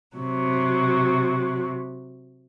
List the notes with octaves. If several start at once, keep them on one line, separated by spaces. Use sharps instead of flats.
C3 F#3